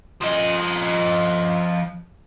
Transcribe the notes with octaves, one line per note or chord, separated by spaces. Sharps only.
F3 D#5